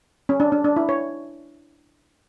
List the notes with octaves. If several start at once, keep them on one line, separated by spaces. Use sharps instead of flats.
C#4
D4
D4
D4
E4
C#5